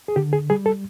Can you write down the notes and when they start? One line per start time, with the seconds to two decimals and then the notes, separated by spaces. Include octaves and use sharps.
0.08 G#4
0.16 D3 G4
0.33 G#4
0.50 G3 G#4
0.66 A4